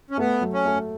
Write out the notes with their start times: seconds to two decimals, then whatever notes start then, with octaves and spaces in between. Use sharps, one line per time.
0.10 C#4
0.18 A3 B3
0.41 F#3
0.53 C#4
0.65 A3